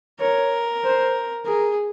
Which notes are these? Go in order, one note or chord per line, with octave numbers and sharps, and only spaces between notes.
A#4 C#5
C5
G#4 A#4